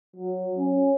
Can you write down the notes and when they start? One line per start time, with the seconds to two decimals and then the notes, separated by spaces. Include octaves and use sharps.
0.16 F#3
0.58 C#4